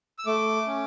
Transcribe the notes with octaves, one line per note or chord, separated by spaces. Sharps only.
E6
A3 D6
C#4